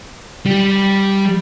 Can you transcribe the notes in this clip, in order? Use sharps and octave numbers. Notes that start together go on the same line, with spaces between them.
G3